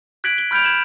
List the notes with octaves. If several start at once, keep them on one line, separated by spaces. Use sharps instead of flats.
F#6 G#6 B6 D7 F#7
G7
B5 F6 G6 G#6 D7 F7
G#6 E7 F#7